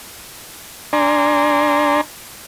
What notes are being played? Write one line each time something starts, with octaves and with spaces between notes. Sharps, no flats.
D4 D5 G#5 A#5 C6